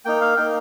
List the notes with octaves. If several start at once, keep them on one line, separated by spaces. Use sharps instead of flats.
A#3 D#4 G5
F5
A#3 D#4 G5